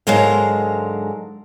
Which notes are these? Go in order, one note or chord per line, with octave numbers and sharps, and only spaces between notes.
G#2 D3 F#3 G#3 A#4 F5